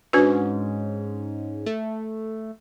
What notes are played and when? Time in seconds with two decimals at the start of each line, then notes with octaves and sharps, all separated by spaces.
0.13 G#2 C#4 D4 F#4 B4
1.66 A3